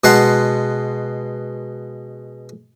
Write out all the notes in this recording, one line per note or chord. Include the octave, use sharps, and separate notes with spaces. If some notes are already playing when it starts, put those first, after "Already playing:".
B2 G#3 F#5 A5 C6